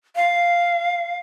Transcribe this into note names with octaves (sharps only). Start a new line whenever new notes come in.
F5